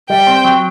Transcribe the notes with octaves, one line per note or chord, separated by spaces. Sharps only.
G3 G5
C4
F#3